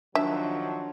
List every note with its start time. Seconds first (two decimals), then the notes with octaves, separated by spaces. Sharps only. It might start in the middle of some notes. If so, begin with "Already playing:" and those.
0.15 D#3 F3 F#3 D4 E5